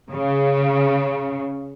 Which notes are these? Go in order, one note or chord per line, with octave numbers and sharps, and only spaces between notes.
C#3